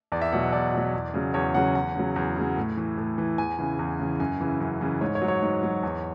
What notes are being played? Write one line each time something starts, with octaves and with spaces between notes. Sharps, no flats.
E2 D5
E5
B2 F#3 F#5
F#5
E2 D5
B2 F#3
E2
C#3 F#3
E2 C#5
C#3 F#3 F#5
E2 F#5
C#3 F#3
E2
C#3 F#3
A2
E3
A2
E3
E2 G#5
C#3 E3
E2
C#3 E3
F#2 G#5
C#3 E3
F#2
C#3 E3
G#2 C#5
C#5
F#3
C#5
G#2
F#3
E2